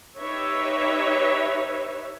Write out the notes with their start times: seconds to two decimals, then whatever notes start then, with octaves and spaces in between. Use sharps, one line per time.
0.18 D#4 G4 B4 C#5 E5